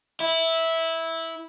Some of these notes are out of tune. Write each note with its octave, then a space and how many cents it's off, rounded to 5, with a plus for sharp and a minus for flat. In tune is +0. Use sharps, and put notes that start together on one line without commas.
E4 -10